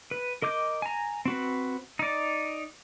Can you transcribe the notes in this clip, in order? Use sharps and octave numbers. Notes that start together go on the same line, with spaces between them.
B4
A#4 D#5 D6 G6
G#5 A#5
C4 F#4 B4
D#4 D5